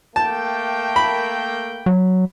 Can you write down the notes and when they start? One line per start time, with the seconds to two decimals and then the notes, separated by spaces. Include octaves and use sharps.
0.16 A3 A#3 G5 A5
0.96 B5
1.86 F#3